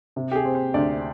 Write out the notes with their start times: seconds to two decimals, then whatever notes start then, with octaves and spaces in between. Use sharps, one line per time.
0.16 C3
0.32 G4
0.35 G#4
0.45 C4
0.55 C5
0.74 D2 D5